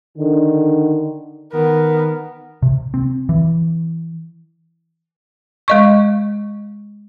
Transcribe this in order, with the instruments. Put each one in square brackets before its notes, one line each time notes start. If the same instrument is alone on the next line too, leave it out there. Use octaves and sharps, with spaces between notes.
[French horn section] D3 [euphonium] D#3
[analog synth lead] D#3 [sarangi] B3 [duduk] A#4
[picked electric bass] C3
C4
E3
[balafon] G#3 D#5 C#6